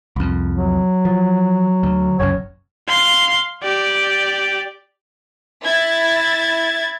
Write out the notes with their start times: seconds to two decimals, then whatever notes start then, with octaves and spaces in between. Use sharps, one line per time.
0.16 C2 F2
0.55 F#3
1.05 F3
1.83 D2
2.20 F#1 C2 F#2 C#5
2.88 F5 C6
3.62 G4 D5
5.66 E4 G#6 A6